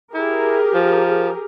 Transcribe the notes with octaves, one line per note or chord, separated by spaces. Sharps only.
E4 G4 G#4 A#4
F3